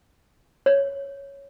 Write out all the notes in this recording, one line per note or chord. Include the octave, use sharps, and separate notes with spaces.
C#5